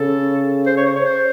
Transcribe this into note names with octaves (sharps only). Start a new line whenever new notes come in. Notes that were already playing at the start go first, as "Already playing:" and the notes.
Already playing: C#3 A4
C5
C#5
C5
C#5
C5